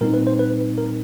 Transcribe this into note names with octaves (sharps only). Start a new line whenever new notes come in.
A#2 G3 C4 D#4 A#4
B4
C5
B4
A#4